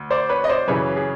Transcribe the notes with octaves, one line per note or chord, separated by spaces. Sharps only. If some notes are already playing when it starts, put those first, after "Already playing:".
Already playing: D2
C5 D5
B4 C#5
D#5
C5 D5
F#2 C#3 E3 B4 C#5
G#4